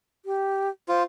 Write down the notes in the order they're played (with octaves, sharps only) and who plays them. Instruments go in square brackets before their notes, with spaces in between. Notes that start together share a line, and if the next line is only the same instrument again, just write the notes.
[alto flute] G4
[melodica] F4 [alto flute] C5